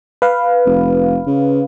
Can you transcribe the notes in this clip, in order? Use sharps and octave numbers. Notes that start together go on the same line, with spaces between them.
B4 F5
F1
C#3